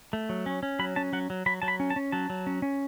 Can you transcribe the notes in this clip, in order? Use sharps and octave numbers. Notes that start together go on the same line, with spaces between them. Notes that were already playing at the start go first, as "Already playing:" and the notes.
A3
F#3
C#4
C#4
F#3 B5
C#4 A5
F#3 F#5
F#3
F#3 B5
F#3 A5
B5
C#4
A5
C#4
F#3 A5
F#3
C#4
C#4